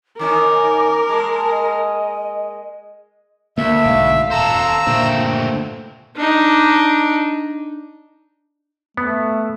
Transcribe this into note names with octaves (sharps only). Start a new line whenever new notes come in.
D#3 C#4 D#4 A#4 D6
G#3 A#3 A5
D#5
D2 A#3 E5
B1 G#2 F5
D#1 A4 C5 A#5 E6
A#2 D3 A3 C4
D4 D#4
A3 B3